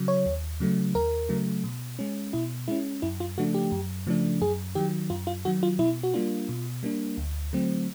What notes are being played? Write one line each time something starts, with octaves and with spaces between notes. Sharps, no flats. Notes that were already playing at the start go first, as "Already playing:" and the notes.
Already playing: C#3 F#3
C#5
D#2
C#3 F#3 A3
D#2 A#4
C#3 F#3 A3
B2
G#3 C#4
B2 E4
G#3 C#4 E4
F#2 E4
F4
C#3 F3 A3 D4 F#4
G4
F#2
C#3 F3 A3 D4
F#2 G#4
D#3 F#3 G4
F#2 F4
F4
D#3 F#3 F#4
F4
B2 E4
F#4
G3 A#3 D4 F4
B2
G3 A#3 D4
D2
D3 F#3 A3 C4